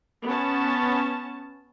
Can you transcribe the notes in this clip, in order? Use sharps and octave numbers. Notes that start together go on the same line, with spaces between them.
B3 C#4 A5